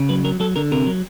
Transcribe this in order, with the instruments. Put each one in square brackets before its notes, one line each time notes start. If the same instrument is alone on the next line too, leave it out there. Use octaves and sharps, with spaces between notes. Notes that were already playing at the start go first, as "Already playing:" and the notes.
Already playing: [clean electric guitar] C#3
F#3 B4
F#3 A#4
F#3 A4
D3 A#4
C3 A#4
F#3